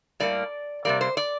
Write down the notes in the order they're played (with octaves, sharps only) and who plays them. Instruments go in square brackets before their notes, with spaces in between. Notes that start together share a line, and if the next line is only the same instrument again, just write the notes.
[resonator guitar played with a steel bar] A2 G3 A#3 D5
C3 G3 A#3 D5
C5
D5